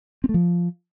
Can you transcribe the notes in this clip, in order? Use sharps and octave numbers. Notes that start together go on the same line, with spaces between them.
C4
A3
F3